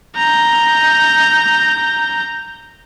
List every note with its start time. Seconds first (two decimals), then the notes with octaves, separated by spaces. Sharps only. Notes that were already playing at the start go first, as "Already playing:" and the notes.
0.16 A#5 G6